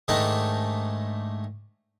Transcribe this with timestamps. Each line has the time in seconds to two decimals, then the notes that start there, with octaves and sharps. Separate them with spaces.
0.08 G#2 D#3 A3 D4 D#4